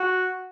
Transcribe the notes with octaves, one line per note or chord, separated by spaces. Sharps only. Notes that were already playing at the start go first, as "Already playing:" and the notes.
Already playing: F#4